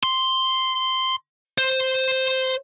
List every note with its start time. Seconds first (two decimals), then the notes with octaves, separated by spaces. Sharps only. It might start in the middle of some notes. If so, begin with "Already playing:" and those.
0.03 C6
1.58 C5